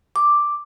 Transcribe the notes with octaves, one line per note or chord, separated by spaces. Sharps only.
D6